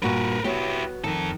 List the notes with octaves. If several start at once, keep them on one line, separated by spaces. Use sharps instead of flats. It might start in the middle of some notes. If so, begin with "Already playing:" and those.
G2 A#2 F#4 A#4 B4
B3 E4 F#4 G4 C#5
F2 D#3 A4